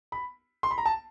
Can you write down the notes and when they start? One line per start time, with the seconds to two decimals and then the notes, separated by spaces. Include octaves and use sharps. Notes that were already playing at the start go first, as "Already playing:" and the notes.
0.12 B5
0.63 C6
0.71 B5
0.78 A#5
0.86 A5